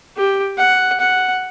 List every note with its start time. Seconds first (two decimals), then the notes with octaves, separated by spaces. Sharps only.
0.17 G4
0.58 F#5
1.00 F#5